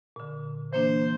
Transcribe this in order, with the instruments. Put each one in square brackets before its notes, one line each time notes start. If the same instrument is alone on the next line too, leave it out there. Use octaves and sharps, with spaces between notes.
[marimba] A#2 D3
[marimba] E3 A#3 D4 [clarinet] C5